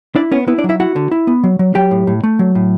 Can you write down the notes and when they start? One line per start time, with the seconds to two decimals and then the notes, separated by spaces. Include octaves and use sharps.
0.16 D4 E4 D5
0.32 B3 C#4 C#5
0.48 B3 E4 B4
0.58 D4 D5
0.64 F#3
0.69 E4 E5
0.80 E4 F#4 F#5
0.96 D3
1.11 E4
1.27 B3
1.44 F#3
1.59 F#3
1.75 F#3 G4 G5
1.91 A2
2.07 A2
2.24 A3
2.39 F#3
2.55 A2